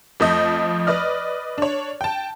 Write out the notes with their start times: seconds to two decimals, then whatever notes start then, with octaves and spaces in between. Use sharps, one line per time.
0.20 F2 F3 A3 D#5 G6
0.87 B4 D5 D#5 F6
1.58 D4 C#5
2.01 G5 A5